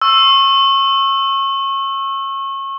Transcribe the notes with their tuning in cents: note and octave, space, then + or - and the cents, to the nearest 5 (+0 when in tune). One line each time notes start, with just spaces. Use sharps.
C#6 -30 E6 +0